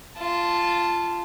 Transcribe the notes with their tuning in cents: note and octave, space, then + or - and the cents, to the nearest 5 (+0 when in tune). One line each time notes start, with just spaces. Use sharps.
F4 -10 A5 +0